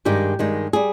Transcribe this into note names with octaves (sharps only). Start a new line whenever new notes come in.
G2 D#3 G#3 G4
G2 D#3 G#3
G3 G#4